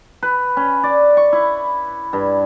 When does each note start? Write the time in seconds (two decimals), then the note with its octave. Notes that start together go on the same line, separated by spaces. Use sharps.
0.23 B4
0.57 C#4
0.83 D5
1.17 C#6
1.33 E4
2.13 G2